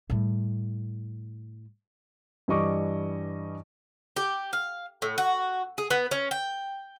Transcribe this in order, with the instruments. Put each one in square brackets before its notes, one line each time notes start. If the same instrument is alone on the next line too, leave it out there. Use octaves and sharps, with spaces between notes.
[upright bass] A2 G3
[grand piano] G2 E3 G3 D#5 C#6 D6
[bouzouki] G4
F5
A2
F#4
G#4
B3
C#4
G5